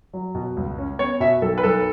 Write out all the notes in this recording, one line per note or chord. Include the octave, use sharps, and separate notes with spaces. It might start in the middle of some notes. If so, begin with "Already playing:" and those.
F#3
B2
C#2
C#4
B3 C#5
B2 E5
B1 A4
B4
B1 A4